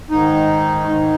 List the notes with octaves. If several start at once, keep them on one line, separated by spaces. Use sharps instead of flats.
G#2 D#3 D#4
G#2 D#3